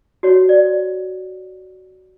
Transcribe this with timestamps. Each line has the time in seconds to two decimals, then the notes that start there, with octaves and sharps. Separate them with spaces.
0.23 F#4 C#5
0.49 D5